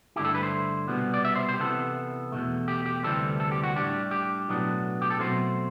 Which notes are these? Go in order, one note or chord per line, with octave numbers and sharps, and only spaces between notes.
G2 D3 A3 E4 G4
A4
B4
C5
C2 B2 G3 B3
D5
E5
C5
C5
G4
C3 E3 B3 A4
E2 B2 A3
G4
G4
D2 C3 E3 G3 C4 A4
A4
G4
F#4
A2 G3 D4 G4
G4
B1 A2 F#3 B3 D4
G4
A4
B2 F#3 A3 C4 C5